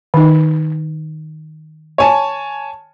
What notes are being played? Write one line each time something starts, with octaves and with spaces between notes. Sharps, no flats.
D#3 D#4
C#5 G#5 A5